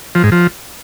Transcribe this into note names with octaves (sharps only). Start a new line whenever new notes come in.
F3
G#2
F3